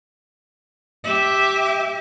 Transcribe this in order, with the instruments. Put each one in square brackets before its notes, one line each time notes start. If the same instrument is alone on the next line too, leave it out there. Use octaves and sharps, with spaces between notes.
[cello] G4 E5